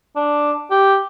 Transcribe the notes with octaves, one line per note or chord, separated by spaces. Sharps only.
D4
G4